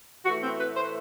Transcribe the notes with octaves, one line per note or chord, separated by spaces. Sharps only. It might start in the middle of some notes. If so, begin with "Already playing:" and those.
A2 E3 A3 F#4
C4
B4
C5